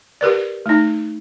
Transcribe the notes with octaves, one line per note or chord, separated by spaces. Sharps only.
G4 A#4 B4 D5
A3 D#4